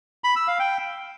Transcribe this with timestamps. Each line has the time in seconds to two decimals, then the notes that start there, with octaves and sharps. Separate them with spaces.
0.24 B5
0.36 E6
0.48 F5
0.59 G5